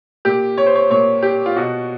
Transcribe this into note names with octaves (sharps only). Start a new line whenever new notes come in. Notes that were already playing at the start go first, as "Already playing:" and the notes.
A#2 G4
C#5
C5
C#5
A#2 C#5
G4
F4
B2 F#4